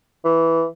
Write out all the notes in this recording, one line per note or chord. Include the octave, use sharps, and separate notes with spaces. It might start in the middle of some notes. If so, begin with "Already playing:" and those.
E3